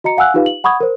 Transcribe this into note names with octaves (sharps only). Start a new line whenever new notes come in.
F#4 D#5 A#5 C#7
F5 F#5 G#5 E6 F#6
D#4 F4 G4 B4 F5
F#7
F#5 B5 C#6 D#6 G#6
A#4 C5